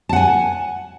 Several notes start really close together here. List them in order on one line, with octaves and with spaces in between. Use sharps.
A5 F#5 G#5